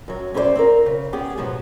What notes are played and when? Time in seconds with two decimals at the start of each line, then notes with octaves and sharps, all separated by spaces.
0.08 F#2 F#3
0.34 C#4 E4 A4 B4 C5 D5
0.55 C4 F4 A#4
0.86 C#3
1.13 B3 C#4 G4 G#4
1.37 G#2 B2 F3 F#3